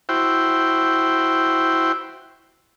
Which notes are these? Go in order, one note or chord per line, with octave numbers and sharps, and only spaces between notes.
E4 F#4 C5 G5